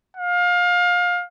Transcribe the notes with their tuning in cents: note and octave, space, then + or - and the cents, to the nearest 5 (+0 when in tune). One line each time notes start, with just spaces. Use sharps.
F5 +25